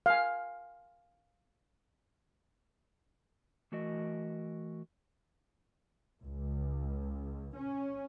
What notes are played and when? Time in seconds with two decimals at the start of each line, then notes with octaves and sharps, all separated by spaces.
0.06 F5 G#5
3.72 E3 A3 F#4 A#4 D#5
6.24 C#2
7.56 C#4